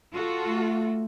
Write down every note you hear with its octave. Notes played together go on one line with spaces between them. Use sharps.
F4 F#4 A4
A3